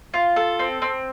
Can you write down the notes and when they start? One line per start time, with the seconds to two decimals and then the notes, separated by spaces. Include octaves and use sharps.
0.14 F4
0.36 A4
0.59 C4
0.82 C4